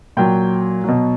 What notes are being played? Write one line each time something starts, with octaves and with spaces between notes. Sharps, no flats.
A#2 F#3 G5
B2 F#3